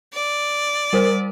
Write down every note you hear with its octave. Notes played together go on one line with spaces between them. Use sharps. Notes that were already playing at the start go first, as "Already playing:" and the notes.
D5
G3 A#4 C5